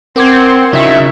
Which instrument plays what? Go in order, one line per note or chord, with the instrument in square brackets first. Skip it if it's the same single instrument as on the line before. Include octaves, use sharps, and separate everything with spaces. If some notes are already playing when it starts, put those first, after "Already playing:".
[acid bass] C4 [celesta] A#4 D6 G#6 [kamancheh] F#5 C6
[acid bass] C#3 [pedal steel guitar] F#3 D#4 E4 [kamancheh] E5 C#6